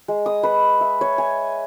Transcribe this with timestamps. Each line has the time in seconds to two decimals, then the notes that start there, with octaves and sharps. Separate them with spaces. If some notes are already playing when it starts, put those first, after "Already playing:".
0.08 G#3
0.26 D#6
0.43 B4
0.81 E5
1.01 C#5
1.18 G#5